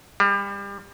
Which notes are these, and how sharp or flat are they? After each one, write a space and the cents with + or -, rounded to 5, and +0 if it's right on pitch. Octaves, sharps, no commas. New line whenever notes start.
G3 +30